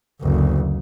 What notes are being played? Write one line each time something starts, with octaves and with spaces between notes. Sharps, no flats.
F#1 D2